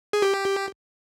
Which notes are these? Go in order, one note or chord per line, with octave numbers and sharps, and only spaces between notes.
G#4
G4